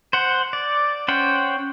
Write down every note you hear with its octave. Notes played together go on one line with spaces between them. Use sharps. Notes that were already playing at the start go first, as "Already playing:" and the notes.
C5 F#5
D5
C#4 C5 F#5 G5